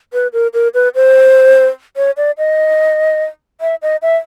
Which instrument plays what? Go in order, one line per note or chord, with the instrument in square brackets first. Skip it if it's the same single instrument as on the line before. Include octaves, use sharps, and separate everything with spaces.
[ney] B4
A#4
A#4
B4
C5
C#5
D5
D#5
E5
D#5
E5